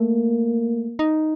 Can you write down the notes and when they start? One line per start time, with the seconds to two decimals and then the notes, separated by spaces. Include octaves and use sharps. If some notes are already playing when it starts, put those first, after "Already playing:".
Already playing: A3 A#3
0.99 D#4